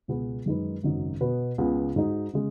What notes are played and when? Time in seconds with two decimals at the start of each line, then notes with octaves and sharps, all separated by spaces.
0.08 C#2 B2 B3 G#4 B4
0.46 F#2 D#3 G#3 D#4 B4
0.83 G#1 F#2 C#3 F#3 D#4
1.20 B2 B3 F#4 B4
1.58 C#2 C#3 B3 G#4
1.96 G#2 G#3 D#4 F#4
2.33 C#3 G#3